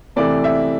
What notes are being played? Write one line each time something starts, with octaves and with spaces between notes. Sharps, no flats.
C3 E3 A3 D5
E5